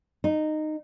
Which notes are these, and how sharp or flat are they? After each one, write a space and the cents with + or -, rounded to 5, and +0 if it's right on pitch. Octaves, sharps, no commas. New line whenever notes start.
D#4 -15